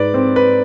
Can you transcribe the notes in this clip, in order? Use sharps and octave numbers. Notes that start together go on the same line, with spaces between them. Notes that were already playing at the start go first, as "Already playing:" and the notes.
Already playing: G#2 B4 D5
C4
B4